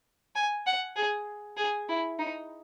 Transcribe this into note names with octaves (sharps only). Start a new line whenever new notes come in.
G#5
F#5
G#4
G#4
E4
D#4